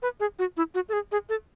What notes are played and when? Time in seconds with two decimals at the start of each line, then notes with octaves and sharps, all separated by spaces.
0.02 B4
0.20 G#4
0.39 F#4
0.57 E4
0.75 F#4
0.89 A4
0.93 G#4
1.12 G#4
1.29 A4